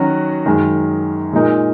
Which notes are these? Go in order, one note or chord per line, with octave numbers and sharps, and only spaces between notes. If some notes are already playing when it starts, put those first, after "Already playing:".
Already playing: D#3 F#3 C#4 F#4
F#2 D#3 G#3
A#2 G#3 D#4 A#4